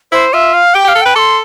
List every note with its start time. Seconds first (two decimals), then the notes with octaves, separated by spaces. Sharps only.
0.12 E4 C5
0.33 F4 E5
0.53 F5
0.74 G4 G5
0.85 G4
0.88 F5
0.95 A4
1.01 B4 G5
1.15 A4 C6 D6